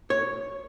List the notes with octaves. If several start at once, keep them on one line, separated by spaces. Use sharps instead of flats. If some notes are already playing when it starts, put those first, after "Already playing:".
C#5